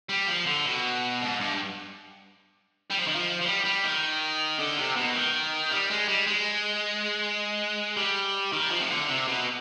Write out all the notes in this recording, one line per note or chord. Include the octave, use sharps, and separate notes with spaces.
G3
F3
D3
B2
G#2
G2
G3
F3
D#3
F3
F3
G3
G3
D#3
D3
C3
B2
D#3
G3
G#3
G3
G#3
G3
D#3
F3
C3
D3
C3
B2